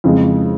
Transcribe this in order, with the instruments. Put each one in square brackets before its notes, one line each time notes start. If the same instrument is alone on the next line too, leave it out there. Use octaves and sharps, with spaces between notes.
[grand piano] F2 C#3 E3 G#3